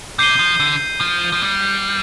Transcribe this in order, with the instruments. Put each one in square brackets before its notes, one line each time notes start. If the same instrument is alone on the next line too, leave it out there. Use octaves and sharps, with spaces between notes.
[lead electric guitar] C3 [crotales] G6 C7 D#7 G7
[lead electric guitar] F3
D3
F3
F3
G3